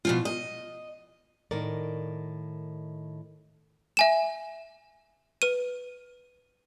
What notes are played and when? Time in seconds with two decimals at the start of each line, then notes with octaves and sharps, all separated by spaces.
0.05 B2 F3 F4
0.25 D#5
1.51 A2 D#3 A#4 D5
3.97 E5 G#5 E7
5.42 B4 D#7